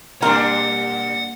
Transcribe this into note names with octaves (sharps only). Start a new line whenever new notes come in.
B2 G3 A#3 D4 A#4 F#5